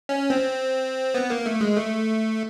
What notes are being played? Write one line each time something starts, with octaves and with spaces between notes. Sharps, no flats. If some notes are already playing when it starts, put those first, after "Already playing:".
C#4
C4
B3
A#3
A3
G#3
A3